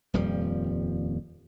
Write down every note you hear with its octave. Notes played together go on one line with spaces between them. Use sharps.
D#1 F2 F3 G3